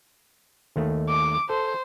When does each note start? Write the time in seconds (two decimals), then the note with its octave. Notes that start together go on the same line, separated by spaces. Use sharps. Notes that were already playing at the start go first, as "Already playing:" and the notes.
0.76 D#2 D#3 A3
1.09 D6
1.50 A4 C5